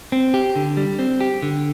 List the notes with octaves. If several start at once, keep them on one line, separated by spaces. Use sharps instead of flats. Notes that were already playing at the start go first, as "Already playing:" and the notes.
C4
G4
D3
G3
C4
G4
D3